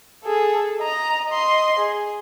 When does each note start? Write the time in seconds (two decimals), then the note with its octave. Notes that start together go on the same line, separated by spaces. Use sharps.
0.24 G#4 A4
0.79 D#5 A#5
1.29 D#5 C6
1.79 G#4